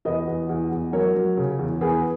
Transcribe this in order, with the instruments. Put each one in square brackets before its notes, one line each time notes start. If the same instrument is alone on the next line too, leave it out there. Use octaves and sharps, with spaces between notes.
[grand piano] E2 B4 D#5
E2
E2
E2
F#3 A#4 C#5
F#3
C#3
E2
E2 G#4 B4